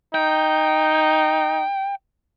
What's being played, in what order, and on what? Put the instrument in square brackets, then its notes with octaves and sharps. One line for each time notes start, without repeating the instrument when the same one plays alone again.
[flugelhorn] D#4 [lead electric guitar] G5